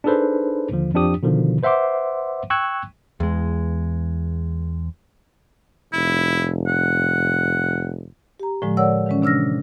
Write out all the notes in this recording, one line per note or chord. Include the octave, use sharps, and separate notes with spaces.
D4 D#4 G#4 A4 B4 C5
D#2 D3 F3
F2 F3 D4 G4 D#6
B2 D3 D#3 F3
B4 C5 E5 F#5 C6 D6
G5 C#6 E6 F#6 G#6
E2 G#3
F1 E4
F#5
G4 A#5
A2 D3 F3 G#3
A#4 C#5 D5 F#5 E6
D#3 E3 G#3 C#4
C3 D4 E6 F6 A#6